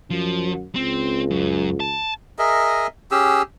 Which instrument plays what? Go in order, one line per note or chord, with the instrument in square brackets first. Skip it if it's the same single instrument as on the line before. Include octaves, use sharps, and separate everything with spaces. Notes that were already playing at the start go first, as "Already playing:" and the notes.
[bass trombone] F#2 [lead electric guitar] F3
[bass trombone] C#2 [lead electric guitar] C4
[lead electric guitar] F#2
A5
[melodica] G#4 A#4 D#5 E5
C#4 G4 G#4 E6